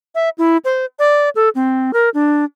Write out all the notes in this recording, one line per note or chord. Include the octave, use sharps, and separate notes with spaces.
E5
E4
C5
D5
A4
C4
A#4
D4